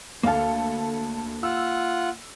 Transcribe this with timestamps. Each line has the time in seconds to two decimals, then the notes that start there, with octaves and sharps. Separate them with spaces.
0.23 D2 A#3 A4 F5
1.43 F4 F#5 E6